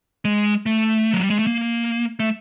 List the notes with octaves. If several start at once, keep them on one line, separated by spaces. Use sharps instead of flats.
G#3
A3
F#3
G3
G#3
A3
A#3
A3